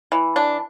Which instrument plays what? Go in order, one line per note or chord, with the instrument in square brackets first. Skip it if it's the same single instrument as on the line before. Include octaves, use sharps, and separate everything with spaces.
[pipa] E3
D4